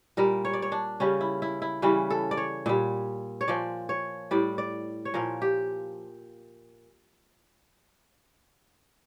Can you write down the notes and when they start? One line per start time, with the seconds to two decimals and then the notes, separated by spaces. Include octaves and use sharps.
0.17 A#2 G3 A#4
0.45 C#5
0.53 D5
0.62 C#5
0.72 D4
1.00 C#3 G3 C#4
1.21 E4
1.42 E4
1.62 E4
1.82 C#3 E3 G3 C#4
2.10 A4
2.31 D5
2.37 C#5
2.66 A#2 G3
3.41 C#5
3.48 A#2 F3 D5
3.89 C#5
4.31 A2 G3 D5
4.58 D5
5.05 C#5
5.14 A#2 F3 A#4
5.42 G4